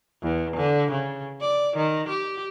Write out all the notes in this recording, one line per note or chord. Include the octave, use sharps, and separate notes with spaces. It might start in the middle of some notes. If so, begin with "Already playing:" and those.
E2
D3
C#3
D5
D#3
G4